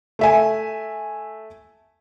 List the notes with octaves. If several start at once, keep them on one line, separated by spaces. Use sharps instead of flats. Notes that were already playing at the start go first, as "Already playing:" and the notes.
A3 E5 G#5